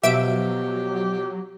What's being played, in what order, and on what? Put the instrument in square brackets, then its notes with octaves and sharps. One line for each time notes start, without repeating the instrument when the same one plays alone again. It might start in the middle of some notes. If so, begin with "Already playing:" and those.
[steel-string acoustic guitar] B2 F3 [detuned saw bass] F#3 [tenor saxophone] G4 [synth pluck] E5 D7